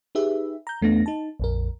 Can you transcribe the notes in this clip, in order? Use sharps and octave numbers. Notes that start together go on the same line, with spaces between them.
D#4 G4 G#4 B4 E5
A#5 G6
E2 A3 B3 D4 A#6
D#4 A5
A#1 F2 A#4